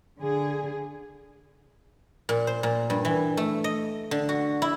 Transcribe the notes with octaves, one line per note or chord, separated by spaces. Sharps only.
D3 G#4
A#2
C5
A#2
G2
E3
A3
D#5
D3
F#4
E4